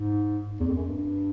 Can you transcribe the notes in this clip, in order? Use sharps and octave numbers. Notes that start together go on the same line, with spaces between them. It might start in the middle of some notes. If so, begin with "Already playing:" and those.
Already playing: G#2
E2
F2
F#2
G2